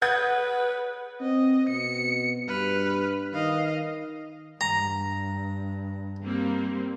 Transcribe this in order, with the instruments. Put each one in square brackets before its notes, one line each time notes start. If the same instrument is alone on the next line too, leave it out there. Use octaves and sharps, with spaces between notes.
[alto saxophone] B4 [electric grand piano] F#5 [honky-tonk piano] D#6 G6 G#6
[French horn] C4 [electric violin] D#5
[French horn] B2 [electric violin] C#7
[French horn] G2 [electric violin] B4 F6
[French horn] D#3 [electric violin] D#5 F5
[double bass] G2 [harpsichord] A#5
[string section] G3 A#3 C4